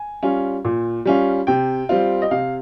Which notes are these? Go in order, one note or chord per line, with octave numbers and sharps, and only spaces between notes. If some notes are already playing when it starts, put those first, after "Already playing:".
Already playing: G#5
G3 C#4 F4
A#2
G3 C#4 F4
C3 G5
G3 C4 F4
D#5
C3 F5